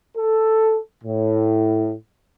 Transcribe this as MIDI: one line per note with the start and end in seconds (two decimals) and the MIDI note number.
0.16 0.76 69
1.03 1.93 45